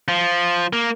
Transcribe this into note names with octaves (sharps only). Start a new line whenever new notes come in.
F3
A#3